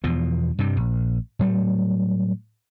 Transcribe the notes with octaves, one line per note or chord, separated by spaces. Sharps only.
E2 B2 F3
G2 C3 G3
A#1
A2 F#3 G3 A3